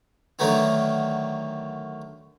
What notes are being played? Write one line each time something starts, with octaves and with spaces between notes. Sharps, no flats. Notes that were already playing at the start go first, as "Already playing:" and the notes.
D3 D#3 F#3 A3 B3 D#4